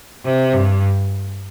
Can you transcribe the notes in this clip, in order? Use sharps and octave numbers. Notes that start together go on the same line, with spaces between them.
C3
G2